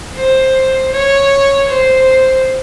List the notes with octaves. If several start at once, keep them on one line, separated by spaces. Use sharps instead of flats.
C5
C#5
C5